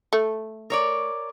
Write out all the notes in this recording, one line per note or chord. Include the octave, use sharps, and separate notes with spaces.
A3
A#4 C#5 D5